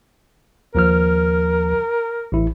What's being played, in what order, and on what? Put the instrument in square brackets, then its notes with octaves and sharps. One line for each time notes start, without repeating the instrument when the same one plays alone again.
[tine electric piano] D#2 F3 F6 [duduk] A#4
[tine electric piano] A1 E4